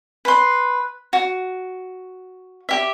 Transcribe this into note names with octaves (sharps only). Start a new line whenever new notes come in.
B4 C6
F#4
G4 E5